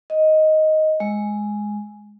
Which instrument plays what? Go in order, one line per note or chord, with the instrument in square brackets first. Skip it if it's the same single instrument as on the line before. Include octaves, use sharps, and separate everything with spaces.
[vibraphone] D#5
G#3